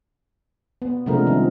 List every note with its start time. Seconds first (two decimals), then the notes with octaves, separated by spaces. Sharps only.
0.82 B3
1.06 C3 F3 G#3 A3 D4 A#4
1.27 D#3 F3 G3